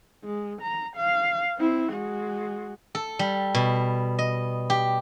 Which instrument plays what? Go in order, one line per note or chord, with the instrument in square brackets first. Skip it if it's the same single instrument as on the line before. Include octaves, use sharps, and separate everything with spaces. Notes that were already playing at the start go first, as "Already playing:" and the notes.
[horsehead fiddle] G#3
A#5
F5
C4 E4
G#3 F#4
[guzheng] A4
G3
B2
D#5
G4